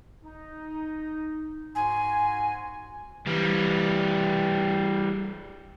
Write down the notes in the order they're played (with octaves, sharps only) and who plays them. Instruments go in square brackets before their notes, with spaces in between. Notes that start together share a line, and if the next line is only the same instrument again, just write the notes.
[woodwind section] D#4
[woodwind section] G#2 F#4 C6 [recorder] G#5
[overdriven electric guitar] E3 G3